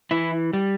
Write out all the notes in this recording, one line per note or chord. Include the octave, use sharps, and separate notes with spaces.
E3 E4
G3